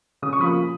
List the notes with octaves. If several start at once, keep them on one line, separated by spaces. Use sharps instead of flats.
C#3 D#6
C#6
F3 A#3 B5 D#6
A#2